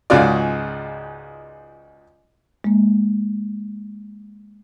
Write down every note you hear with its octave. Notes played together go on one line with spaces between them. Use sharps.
C#2 G#2 C#3 F4 F#4 D5
G#3 A#3